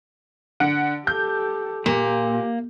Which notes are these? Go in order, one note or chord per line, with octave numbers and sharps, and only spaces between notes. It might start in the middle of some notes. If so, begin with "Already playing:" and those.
D3 F#5 D7
G4 A4 G6
A#2 A#3 G4